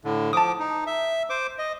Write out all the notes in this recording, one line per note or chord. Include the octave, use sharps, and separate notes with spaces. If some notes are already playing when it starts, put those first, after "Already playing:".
A2 D3
F3 A5 D6 D#6
D#4
E5
C5 D6
D#5